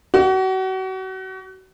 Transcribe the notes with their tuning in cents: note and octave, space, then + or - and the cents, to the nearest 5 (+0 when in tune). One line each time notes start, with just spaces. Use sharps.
F#4 +35